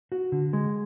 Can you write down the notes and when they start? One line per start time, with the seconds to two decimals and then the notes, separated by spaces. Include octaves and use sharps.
0.12 F#4
0.32 D3
0.53 G#3